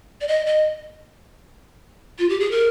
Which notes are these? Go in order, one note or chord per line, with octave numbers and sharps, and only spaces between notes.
D5
D#5
D#5
F4
G4
G#4
A#4